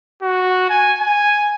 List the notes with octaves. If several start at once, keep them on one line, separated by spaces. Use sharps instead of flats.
F#4
G#5
G#5